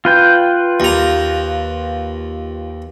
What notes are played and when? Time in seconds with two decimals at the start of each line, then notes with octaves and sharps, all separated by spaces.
0.05 F4 B4 G5
0.80 D#2 A#5